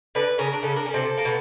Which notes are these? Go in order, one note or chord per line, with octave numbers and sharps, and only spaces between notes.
D3 D4 B4
C#3 C#4 A#4
D4
C#3 C#4 A4
D4 A#4
C#4
C3 C4 A4
A#3
B2